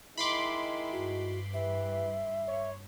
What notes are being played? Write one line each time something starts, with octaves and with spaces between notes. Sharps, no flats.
D#3 G#3 E4 B5 C6 D6
G2 F#4
E3 G4 B4 E5
C#5